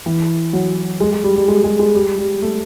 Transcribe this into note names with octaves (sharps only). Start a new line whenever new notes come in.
E3
F#3
G#3
G#3
G3
G3
G#3
G#3
G#3
G3
G3
A3